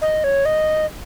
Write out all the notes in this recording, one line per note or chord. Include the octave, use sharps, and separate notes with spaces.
D#5
C#5
D#5